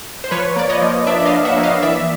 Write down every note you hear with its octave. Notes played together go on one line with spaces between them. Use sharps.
C5
F3 B4 C#5
A#3 D5
C#5 D#5
F3
D4 D5 E5
D#5 F5
F3
E5 F#5
A#3
D#5 F5
E3 D5 E5